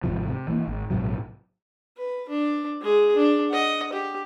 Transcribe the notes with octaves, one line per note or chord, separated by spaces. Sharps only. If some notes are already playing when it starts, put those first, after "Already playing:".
G#1 G#2 C3 F3
C3
E3 A3 A#3
G#1
A#1 G#2 C3 F#3
B4
D4
G#3 G#4
D4
D#5 F#5
G4